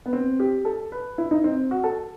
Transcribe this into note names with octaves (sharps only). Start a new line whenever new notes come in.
B3
C4
G4
A4
B4
E4
D#4
C4
F#4
A4